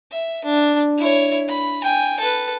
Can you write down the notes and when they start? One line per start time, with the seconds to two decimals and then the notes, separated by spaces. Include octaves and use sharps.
0.12 E5
0.45 D4
0.99 E4 C#5
1.49 B5
1.84 G5 G#5
2.20 A4 B4